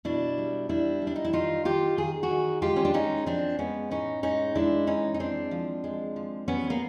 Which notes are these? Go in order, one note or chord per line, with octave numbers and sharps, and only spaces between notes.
B2 D4 E4
G3
G3 D4 E4
G3
D4
D#4
E4
D#3 D#4 F4
D#3 F4 G4
D#3 G#4
F#4 G#4
D#3
G#3 F4 G4
C#4
D4
G#3 C#4 D#4
F3 C4 D4
G#3 B3 C#4
A2 C#4 D#4
G#3 C#4 D#4
G#3 D4 E4
E3 C#4 D#4
D#4
G#3 C4 D4
F3
G#3
F3
G3 B3 C#4
A#3